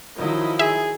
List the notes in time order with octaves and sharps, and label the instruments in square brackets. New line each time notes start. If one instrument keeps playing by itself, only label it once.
[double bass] D#3 F#3 [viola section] F3 E4 D#5
[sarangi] G#4 [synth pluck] E5